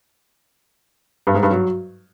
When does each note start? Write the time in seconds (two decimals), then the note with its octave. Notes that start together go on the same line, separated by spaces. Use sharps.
1.27 G2
1.35 G#2
1.43 G2
1.51 F#3